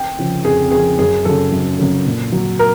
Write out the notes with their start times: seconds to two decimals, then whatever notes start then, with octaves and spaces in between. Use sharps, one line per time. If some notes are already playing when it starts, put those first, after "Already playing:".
Already playing: G5
0.19 C#3 F3
0.45 F2 G#4
0.71 C#3 F3 G#4
0.99 F#2 G#4
1.25 C#3 F#3 A4
1.52 F#2
1.79 C#3 F#3
2.06 A#2
2.32 F#3
2.59 A#4